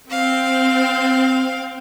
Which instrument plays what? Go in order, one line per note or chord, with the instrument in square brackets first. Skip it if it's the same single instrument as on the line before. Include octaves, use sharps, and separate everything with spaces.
[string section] C4 [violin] F5